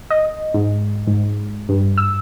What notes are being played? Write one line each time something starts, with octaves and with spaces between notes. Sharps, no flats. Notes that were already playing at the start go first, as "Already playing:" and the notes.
D#5
G#2
G#2
G2
E6